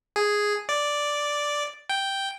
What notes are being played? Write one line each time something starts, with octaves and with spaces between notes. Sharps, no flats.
G#4
D5
G5